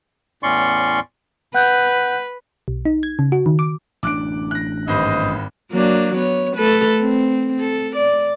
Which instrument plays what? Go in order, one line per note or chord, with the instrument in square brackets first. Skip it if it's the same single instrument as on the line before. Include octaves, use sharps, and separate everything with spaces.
[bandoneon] E2 A2 C#4 D5 C6 C#6
[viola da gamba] B4 [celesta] F#5 F#6 G6
[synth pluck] B1
D#4
G#6
C#3
F#4
D#3
D6
[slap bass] A1 D4 [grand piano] D6 F#6 D7
[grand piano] F#6 A#6
[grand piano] G#1 G2 [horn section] B4 C5 D#5
[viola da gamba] F#3 A#3 D4
B3 C#5
A3 A4 B4
C4
A4
D5